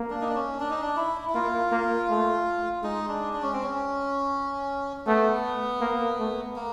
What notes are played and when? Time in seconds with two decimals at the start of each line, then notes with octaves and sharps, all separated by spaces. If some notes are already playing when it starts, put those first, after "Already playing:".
Already playing: A#3
0.10 D4
0.21 D#4
0.28 D4
0.35 C#4
0.60 D4
0.70 D#4
0.82 D4
0.97 E4
1.29 E4
1.34 A#3 F4
1.71 A#3
2.09 A3
2.83 G#3 D#4
3.09 D4
3.33 D4
3.42 C#4
3.53 C4
3.62 C#4
5.06 A3 B3
5.81 A#3
6.18 A3
6.56 A#3